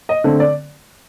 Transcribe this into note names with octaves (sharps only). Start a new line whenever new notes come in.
D#5
D3 A3 C4
D5